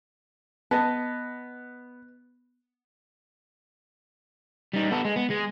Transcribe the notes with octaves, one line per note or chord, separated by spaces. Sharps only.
B3 D#5 A5
G3 D#4
B3 A4
G#3
B3
G#3 G#4